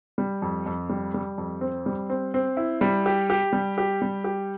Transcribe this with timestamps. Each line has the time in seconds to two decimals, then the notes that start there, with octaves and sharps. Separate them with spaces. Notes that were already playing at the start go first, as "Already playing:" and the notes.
0.18 G3
0.42 F2
0.66 F2
0.89 G3
1.14 G3
1.38 F2
1.61 C4
1.86 G3
2.10 C4
2.34 C4
2.57 E4
2.81 G3
3.06 G4
3.30 G4
3.53 G3
3.78 G4
4.02 G3
4.24 G4